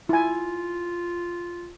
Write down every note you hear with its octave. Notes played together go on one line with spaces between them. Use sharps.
E4 F4 G#5